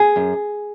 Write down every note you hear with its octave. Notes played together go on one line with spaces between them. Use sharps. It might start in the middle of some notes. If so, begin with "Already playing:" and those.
Already playing: G#4
F#2